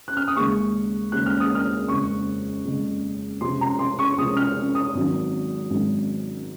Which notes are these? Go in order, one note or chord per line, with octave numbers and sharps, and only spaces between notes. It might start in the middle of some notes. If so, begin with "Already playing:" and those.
F#6
F6
D#6
D#2 C#3 G#3 C#6
D#2 C#3 G#3 F#6
F6
D#6
F6
F#1 F2 C#3 G#3 C#6
F#1 F2 C#3 G#3
C#2 C3 F3 C6
A#5
C6
C#6
C#2 C3 F3 D#6
F6
D#6
G#1 G#2 D#3 F#3
G#1 G#2 D#3 F#3